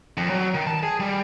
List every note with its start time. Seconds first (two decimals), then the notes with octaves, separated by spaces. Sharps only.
0.17 F2
0.30 F#3
0.54 D#3
0.67 A5
0.83 G#4
1.00 G3